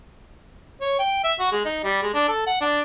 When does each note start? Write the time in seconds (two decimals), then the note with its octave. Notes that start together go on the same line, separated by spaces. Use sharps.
0.81 C#5
0.99 G5
1.24 E5
1.40 F#4
1.52 G#3
1.65 D#4
1.84 G3
2.02 G#3
2.14 D4
2.28 A4
2.47 F#5
2.61 D4